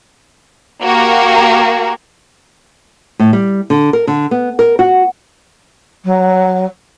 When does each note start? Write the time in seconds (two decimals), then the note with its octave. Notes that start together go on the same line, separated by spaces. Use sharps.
0.83 A#3 F#4 G4 A#4
3.19 A2
3.33 G3
3.70 D3
3.93 A#4
4.07 D3
4.31 B3
4.59 A#4
4.79 F#4
6.05 F#3